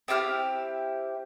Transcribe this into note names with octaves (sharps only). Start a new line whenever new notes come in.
C4 E4 G4 F6